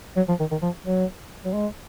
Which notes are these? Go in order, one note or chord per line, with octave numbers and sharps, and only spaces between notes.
F#3
F3
D#3
D#3
F3
F#3
F#3
G#3